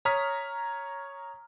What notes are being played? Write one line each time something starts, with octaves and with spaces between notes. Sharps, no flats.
C#5 A#5 D#6 F6 B6